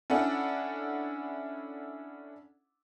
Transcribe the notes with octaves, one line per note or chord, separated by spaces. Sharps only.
C#4 D4 E4 A4 F#5